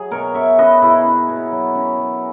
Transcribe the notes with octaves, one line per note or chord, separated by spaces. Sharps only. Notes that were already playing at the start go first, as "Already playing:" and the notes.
Already playing: F#3 G#4
B2 A#4 C#5
B2 C#5 E5
C#4 B4 D#5
B2 E4 G#4
C#4
B2
F#3
C#4
F#3